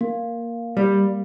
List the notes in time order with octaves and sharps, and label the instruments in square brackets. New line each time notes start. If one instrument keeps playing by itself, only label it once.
[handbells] A#3
[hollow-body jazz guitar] G3